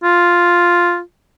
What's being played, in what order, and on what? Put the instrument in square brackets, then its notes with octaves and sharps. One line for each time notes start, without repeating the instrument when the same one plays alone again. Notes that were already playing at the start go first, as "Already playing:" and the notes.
[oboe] F4